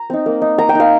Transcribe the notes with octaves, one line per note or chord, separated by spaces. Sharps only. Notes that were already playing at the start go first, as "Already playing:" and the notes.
Already playing: A#5
C4 D#4
A#3
D#4
A#3 A#5
G5
D#4 F5